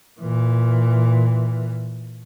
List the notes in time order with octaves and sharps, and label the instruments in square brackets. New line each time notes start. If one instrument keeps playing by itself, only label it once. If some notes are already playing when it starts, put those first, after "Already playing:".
[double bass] A#2 E3